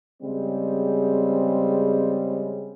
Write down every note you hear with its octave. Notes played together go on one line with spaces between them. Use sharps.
C#3 G3 G#3 C4